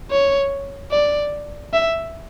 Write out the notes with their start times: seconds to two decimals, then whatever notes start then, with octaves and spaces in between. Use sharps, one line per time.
0.11 C#5
0.91 D5
1.73 E5